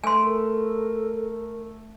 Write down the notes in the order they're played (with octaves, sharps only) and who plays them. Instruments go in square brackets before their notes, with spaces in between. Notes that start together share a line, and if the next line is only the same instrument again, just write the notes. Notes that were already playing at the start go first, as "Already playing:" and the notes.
[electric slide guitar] A3 [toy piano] G#5 C6
[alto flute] A4 [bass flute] A#4